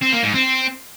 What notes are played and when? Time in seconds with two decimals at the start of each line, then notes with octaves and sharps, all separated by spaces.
0.02 C4
0.13 A#3
0.23 G#2
0.34 C4